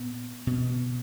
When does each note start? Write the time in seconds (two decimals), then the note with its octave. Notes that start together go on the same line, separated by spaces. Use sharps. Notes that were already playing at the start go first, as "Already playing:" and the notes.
Already playing: A#2 B3
0.47 B2